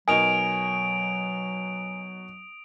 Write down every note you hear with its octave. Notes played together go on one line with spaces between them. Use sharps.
B2 F#3 D#4 A#4 G#5 D#6 D7 F7